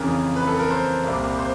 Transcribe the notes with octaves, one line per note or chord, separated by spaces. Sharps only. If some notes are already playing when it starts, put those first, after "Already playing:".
Already playing: F2 C#3 E3 A#4
B4
A4
A#4
C5
C2 A#2 G3 A#3
C5